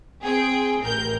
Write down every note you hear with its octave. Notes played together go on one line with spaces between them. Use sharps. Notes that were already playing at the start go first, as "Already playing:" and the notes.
C4 G#4 G5
A1 A#4 G6